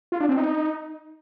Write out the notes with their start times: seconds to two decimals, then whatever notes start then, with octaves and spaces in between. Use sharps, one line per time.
0.12 F4
0.20 D4
0.29 C4
0.37 D#4